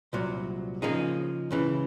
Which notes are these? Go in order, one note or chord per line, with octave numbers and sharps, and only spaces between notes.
C2 A#2 F#3
C#3 F3 A#3 D#4 G#4
C#2 C#3 E3